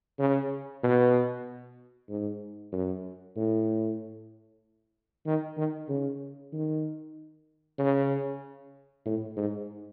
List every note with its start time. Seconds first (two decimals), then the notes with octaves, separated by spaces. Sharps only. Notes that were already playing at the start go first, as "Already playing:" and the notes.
0.19 C#3
0.83 B2
2.09 G#2
2.72 F#2
3.36 A2
5.26 D#3
5.57 D#3
5.89 C#3
6.53 D#3
7.79 C#3
9.06 A2
9.37 G#2